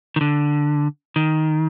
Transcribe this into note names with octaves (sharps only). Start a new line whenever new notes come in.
D#3
D3
D#3